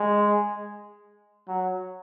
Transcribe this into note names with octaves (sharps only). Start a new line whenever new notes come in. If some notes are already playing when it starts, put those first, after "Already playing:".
Already playing: G#3
F#3